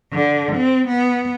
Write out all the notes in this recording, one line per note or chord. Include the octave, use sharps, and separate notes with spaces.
D3
C4
B3